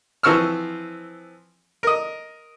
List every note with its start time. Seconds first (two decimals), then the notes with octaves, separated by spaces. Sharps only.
0.23 E3 F3 C4 C#6 E6 F6
1.83 A#4 D#5